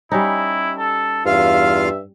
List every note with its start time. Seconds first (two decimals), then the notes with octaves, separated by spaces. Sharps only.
0.12 G3 C#4 D#4 E4
0.78 A4
1.26 E2 G2 F4 E5 F5